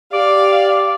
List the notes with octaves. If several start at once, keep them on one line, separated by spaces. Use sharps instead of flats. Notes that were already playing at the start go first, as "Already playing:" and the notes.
G4 D5 F5 D6